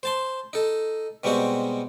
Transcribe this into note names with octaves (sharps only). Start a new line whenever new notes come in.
C5 A5 C6
D#4 A4
B2 G3 G#3 B3 C4 F#4